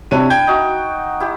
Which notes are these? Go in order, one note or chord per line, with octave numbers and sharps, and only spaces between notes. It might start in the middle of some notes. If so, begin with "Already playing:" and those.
C3 D4 E4 C#5 D#7
G5 G6 G#6
D#4 F#4
E4 G4